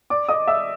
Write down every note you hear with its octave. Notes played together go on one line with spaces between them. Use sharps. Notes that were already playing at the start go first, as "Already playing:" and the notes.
D5 D6
D#5 D#6
E5 E6